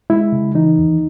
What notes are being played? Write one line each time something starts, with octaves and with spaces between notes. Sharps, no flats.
G#3 E4
C#3
E3 D#4
D#2